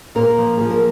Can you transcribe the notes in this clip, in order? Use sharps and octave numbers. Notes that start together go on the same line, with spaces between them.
A#2 A#3 A#4
F3
F3 G#4
A#4